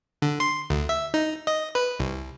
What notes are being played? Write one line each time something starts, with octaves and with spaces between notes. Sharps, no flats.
D3
C6
D2
E5
D#4
D#5
B4
C2